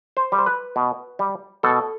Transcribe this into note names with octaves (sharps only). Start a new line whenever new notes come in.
C5
G3
C5
B4
B2
G3
B2 A4